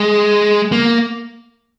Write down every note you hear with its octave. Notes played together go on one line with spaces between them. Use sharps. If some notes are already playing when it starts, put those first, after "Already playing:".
Already playing: G#3
A#3